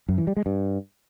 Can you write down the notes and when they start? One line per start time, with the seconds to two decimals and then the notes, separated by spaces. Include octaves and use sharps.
0.09 F#2
0.18 E3
0.27 G3
0.37 G#3
0.46 G2